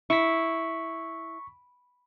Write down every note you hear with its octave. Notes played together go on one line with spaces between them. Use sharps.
E4 C#6 B6